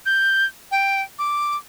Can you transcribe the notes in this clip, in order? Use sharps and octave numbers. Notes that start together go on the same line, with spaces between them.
G6
G5
D6